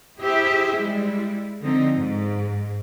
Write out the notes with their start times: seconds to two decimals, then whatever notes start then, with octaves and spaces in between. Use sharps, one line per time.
0.20 E4 G4 G#4 C5 E5
0.75 G3 G#3 E4
1.61 D3 F3 C4 D#4
1.95 G#2